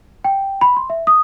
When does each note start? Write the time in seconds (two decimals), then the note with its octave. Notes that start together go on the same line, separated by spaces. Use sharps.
0.24 G5
0.61 B5
0.77 C6
0.90 E5
1.07 D#6